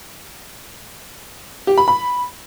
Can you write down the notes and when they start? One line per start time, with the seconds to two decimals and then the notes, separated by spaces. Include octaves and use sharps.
1.67 G4
1.77 B5
1.88 B5